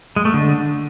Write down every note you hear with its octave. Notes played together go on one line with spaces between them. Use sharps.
G#3
A3
D3